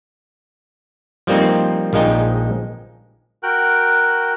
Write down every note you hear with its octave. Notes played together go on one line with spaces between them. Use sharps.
F3 G3 A#3 C4 D#4
A#1 F3 G#3 D#4 G5
F#4 A#4 G5 F#6